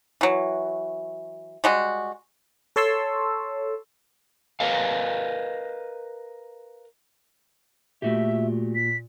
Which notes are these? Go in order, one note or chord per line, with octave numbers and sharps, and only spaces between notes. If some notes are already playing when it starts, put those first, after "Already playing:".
E3 F#3
G3 G#3 F#4
A4 C#5 A5 C6 C#6 E6
A#4 B4 D#5 F5
A#2 A3 F#4 G4 E5
B6